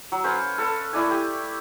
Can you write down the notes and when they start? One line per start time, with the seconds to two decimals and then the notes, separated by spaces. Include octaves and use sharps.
0.12 F#3
0.24 C#4 B4 C5 F5
0.58 A4 B4 A5
0.93 A3 E4 D5 G#5
1.11 G4